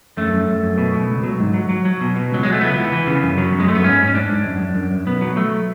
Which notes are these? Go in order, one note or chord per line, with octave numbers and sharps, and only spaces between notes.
F#2 A3
F#2
F#2
F#2
B2
B2
C#2
F#3
G#2
F#3
F#3
F#3
B2
B2
C#2 F#3
F#3 G#3
A3
C#2 B3
E3
E3
C#3
F#2
F#3
F#2
G#3
F#2 A3
B3
G#2 C#4
G#2
C#4
G#2 D4
G#2
F#2
F#2
F#2
F#2
B1 B3
F#3
F#3 A3